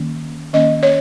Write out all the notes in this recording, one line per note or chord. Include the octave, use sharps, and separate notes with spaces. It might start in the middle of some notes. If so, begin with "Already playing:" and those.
Already playing: D#3 A#3 C#4
D#3 A#3 C#4 D#5
C#5